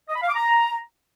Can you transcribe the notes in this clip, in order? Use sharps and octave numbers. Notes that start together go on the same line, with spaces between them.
D#5
B5
F5
D6
A#5